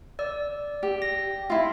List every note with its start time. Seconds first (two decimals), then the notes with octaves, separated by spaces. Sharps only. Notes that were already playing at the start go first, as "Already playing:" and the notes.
0.19 D5 E6
0.83 G4
1.02 A#6
1.50 E4 F4